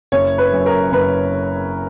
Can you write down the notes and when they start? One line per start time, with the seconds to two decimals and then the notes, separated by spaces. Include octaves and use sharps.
0.12 F#1 C#5
0.38 B4
0.53 F#2
0.66 A#4
0.92 F#1 B4